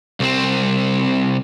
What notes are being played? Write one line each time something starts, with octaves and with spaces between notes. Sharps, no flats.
C2 C4